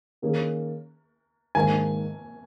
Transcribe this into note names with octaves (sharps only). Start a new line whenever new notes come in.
D#3 A#3 C#4 G#4
G#2 D#3 A#3 G#5